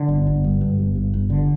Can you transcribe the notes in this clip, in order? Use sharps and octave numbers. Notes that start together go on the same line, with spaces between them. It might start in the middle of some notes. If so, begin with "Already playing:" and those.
Already playing: D3
G1
G1
G2
G2
G1
G2
G1
D3